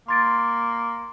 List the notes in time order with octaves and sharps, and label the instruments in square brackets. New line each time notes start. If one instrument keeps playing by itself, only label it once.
[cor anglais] A#3 [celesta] C6 A6 D7